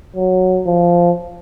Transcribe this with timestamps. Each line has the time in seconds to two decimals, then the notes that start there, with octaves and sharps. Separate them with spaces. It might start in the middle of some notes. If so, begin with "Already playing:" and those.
0.16 F#3
0.66 F3